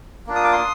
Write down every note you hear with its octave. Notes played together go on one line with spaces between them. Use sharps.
A#3 D4 F4
D#6
D6
C6 D#6